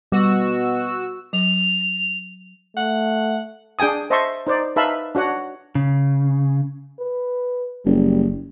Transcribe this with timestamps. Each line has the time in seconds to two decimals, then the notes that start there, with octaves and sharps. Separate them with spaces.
0.12 B2 G3 F#4 E6
1.33 F#3 F7
2.77 A3 F#5
3.79 D4 G#4 G5 G#5 D#6
4.10 C5 D#5 E5 A5 C6 C#6
4.47 D#4 C5 D5
4.76 D#4 B4 E5 F5 A5 B5
5.15 D4 F#4 C#5 F#5
5.75 C#3
7.00 B4
7.85 F#1 G3